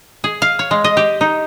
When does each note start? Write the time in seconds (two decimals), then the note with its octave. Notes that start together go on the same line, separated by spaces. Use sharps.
0.24 G#4
0.42 F5
0.59 C#5
0.71 G#3
0.84 D#5
0.97 G4
1.21 D#4